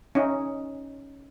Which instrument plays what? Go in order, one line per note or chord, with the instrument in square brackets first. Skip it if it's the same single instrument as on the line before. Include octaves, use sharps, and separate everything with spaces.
[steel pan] C#4 D#4